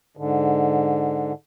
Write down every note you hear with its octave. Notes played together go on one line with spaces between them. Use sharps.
G#2 D3